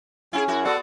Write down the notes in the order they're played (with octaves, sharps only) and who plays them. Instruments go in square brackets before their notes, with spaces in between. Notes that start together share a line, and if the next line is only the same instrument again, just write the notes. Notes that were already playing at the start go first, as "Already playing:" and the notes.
[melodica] C#4 [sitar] E4 F4 G#4
[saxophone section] F#2 E4 [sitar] F#4
[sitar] B3 [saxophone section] F#4 D5 [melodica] A4